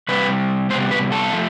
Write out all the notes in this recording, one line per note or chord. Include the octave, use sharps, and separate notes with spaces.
C3 G3 C4 B4
C3 G3 B3 C5
B4
A4
F3 A3